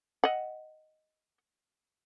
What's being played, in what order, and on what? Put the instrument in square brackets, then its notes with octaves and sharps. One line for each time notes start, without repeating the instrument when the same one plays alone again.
[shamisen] D#5 F#5